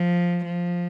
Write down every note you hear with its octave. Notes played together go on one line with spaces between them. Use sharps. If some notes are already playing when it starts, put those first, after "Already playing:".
Already playing: F3
F3